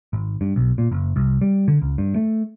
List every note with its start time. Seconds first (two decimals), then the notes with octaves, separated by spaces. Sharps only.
0.13 G#1
0.41 G2
0.56 B1
0.78 A#2
0.91 F#1
1.16 C2
1.41 G3
1.68 D3
1.82 C#2
1.98 G2
2.16 A3